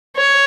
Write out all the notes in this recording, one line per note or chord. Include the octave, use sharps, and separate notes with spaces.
C#5